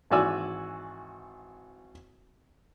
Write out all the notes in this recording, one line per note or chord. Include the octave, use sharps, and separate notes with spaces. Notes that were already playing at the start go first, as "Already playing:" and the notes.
G#1 E3 F#4 D5 G#5 E6